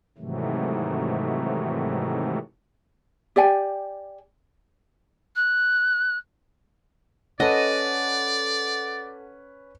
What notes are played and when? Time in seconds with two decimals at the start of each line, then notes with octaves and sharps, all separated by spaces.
0.18 G#2 C3 D#3 E3 F#3 A3
3.36 G4 D5 G5 G#5
5.35 F#6
7.40 C#4 A4 B4 D5 D#5 F#5